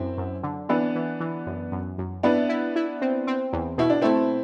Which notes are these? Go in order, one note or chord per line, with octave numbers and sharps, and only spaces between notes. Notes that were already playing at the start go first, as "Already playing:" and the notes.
Already playing: F#2 C4 E4
F#2
D3
E3 B3 D4
E3
E3
F#2
F#2
F#2
B3 D4 E4
E4
E4
C4
C4
E2
B2 E4
D4
A3 C4 E4